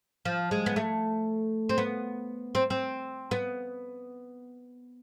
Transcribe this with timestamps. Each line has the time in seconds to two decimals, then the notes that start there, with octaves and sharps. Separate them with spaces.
0.25 F3
0.51 G#3
0.66 B3
0.76 A3
1.69 C4
1.78 B3
2.55 C4
2.70 C4
3.31 B3